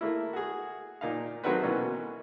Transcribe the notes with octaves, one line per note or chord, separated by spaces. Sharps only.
A3 A#3 E4
F#4 G#4
A#2 D#4 F5
D#3 F#3 A3 C4 F#4 B4
B2 E3 A#3 C#4